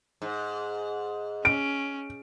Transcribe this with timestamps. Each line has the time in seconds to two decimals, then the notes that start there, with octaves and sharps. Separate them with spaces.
0.22 G#2
1.45 C#4 D7